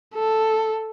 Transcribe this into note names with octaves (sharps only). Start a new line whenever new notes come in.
A4